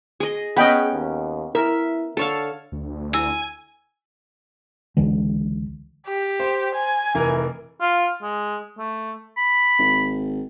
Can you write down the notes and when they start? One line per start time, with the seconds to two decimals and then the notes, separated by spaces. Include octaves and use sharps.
0.20 G#4 D#5
0.56 B3 C#4 G#4 D#5 G5 B5
0.92 D#2
1.55 E4 A#4 E5
2.17 D3 A4 C#5 F5
2.72 D2
3.14 E4 G#5 E6
4.97 C#2 D3 E3 G#3
6.07 G4
6.40 C5
6.75 G#5
7.15 F1 E3 A#4
7.81 F4
8.23 G#3
8.78 A3
9.37 B5
9.78 G#1